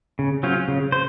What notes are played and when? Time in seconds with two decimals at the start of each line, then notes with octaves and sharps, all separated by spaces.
0.19 C#3
0.43 F#3 C#4 F4 C5
0.68 C#3
0.92 C5